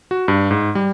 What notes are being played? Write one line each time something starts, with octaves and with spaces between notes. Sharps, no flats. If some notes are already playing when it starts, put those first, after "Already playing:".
F#4
G2
G#2
G3